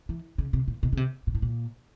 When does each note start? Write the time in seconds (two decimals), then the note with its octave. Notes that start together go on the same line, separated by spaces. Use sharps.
0.09 E3
0.38 C#3
0.53 C3
0.68 A#2
0.83 B2
0.93 C#3
0.97 C3
1.27 A#2
1.35 A2
1.42 A#2